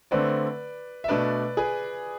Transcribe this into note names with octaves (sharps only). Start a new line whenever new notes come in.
D3 A3 C4 B4 D5
E5
B2 A3 D4 B4 D5
G#4 B4